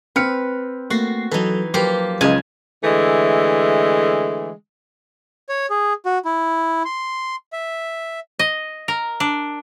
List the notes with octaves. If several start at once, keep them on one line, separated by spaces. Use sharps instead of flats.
C4 B4 F6 C#7
A3 A#3 F#4 C7
E3 F#3 D#4 A4
F3 F#3 A#3 G4 B4
C#2 C#3 D#5 G#5 A5
D3 E3 G#3 A3
C#5
G#4
F#4
E4
C6
E5
D#5
A#4
D4